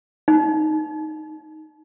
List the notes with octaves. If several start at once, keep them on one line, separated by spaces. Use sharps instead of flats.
D#4